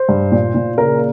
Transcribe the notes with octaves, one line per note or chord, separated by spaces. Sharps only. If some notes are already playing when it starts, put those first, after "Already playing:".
Already playing: C5
G2
A#2
A#2
C#3 A#4